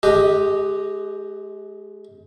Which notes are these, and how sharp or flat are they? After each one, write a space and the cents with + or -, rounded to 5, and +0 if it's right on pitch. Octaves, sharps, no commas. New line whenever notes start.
G#3 +35 G4 +0 D#5 -5